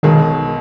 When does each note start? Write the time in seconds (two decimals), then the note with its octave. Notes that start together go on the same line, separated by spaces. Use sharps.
0.03 B1 B2 D#3 G#3 D#4 G#4